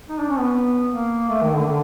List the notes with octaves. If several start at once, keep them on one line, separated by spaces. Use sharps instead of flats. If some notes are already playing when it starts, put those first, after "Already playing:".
D#4
D4
C#4
B3
A#3
A3
D#3
D3
D3